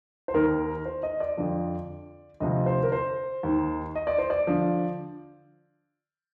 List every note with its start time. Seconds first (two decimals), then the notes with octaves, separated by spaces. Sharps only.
0.28 C5
0.34 D#2 D#3 A#4
0.86 C5
1.03 D#5
1.20 D5
1.37 F2 D3 F3
2.40 D2 C3 F3 D#5
2.66 C5
2.83 A#4
2.92 C5
3.43 D#2
3.48 D#3
3.96 D#5
4.07 D5
4.18 C5
4.30 D5
4.47 D3 F3